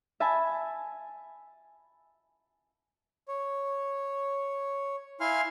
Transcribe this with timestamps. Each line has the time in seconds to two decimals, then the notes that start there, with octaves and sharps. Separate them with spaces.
0.20 E5 G#5 A5 B5
3.28 C#5
5.21 E4 F5 G#5 C6 F6